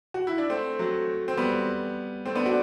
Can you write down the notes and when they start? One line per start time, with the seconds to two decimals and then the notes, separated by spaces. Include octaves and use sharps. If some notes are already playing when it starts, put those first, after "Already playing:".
0.14 F#4
0.27 E4
0.38 D4
0.50 A3 C4
0.79 F#3 A3
1.28 C4
1.37 G3 B3
2.25 A3 C4
2.35 B3 D4
2.46 D4 F#4